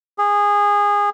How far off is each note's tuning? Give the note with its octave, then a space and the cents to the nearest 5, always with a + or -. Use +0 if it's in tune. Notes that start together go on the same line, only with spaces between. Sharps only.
G#4 -20